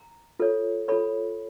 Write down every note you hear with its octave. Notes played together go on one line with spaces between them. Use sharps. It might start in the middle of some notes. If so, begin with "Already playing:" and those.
Already playing: A#5
F4 A4 C#5
F4 A4 C#5 B5